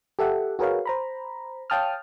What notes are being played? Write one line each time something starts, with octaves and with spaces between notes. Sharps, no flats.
G4 A4 E5 F#5
F#4 G#4 A#4 B4 C#5 F5
C5 A#5 B5
C#5 F5 G5 A5 D#6 F6